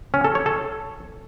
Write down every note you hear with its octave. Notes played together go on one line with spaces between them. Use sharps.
C#4
A4
C#5
A4